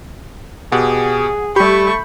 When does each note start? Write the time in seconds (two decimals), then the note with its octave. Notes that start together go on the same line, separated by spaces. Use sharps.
0.72 B2 G4 G#4 F#5
1.56 G3 A3 G4 B5 C#6 G6